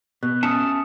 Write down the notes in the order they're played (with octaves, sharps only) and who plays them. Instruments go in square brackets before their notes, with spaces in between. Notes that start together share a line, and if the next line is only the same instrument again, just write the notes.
[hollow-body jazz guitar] B2 [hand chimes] F#6
[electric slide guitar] A3 C#4 A5 [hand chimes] D#6 C#7